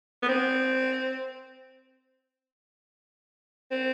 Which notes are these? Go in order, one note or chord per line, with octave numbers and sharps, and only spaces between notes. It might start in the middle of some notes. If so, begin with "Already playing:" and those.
B3
C4
C4